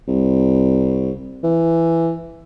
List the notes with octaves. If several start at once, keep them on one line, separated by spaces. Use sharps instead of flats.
C2
E3